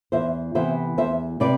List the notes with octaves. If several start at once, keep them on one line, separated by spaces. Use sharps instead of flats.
E2 C5 E5
C3 E3 B3 C5 E5
E2 C5 E5
C3 B4 D5